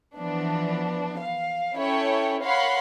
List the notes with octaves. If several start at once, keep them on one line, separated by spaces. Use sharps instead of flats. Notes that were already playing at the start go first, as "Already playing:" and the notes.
E3 F3 B3 D4
F5
C#4 E4 A4 C#5 G5
A#4 C#5 F5 F#5 B5 C6